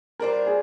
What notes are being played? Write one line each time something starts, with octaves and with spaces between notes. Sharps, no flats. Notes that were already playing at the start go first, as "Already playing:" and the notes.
G3 D4 F4 A#4 C5
G#4